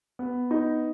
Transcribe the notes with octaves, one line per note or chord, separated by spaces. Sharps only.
B3
D#4